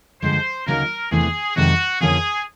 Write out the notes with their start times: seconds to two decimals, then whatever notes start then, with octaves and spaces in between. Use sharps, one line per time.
0.22 G2 D3 F3 G#3 C5
0.66 D2 C#3 F#3 A#3 D#4 A#4
1.11 E2 C3 E3 A3 D4 G#4
1.56 F2 C3 D#3 G#3 C4 F#4
2.01 F2 D3 F3 A#3 C#4 G#4